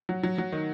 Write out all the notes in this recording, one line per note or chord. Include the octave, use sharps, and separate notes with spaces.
F#3
F#3
F#3
D#3